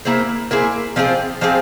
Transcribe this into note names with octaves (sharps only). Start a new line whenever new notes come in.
A#3 E4 G#4 C5
A#3 E4 G#4 C5
F3 C4 F4 G#4
F3 C4 F4 G#4